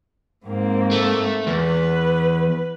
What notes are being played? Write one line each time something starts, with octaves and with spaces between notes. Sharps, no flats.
G#2 A#3 C4
A3
E2 B4